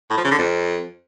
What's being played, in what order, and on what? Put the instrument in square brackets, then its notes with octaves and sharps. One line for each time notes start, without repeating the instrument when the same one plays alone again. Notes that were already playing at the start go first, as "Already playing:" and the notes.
[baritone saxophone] A2
F3
C#3
D3
F2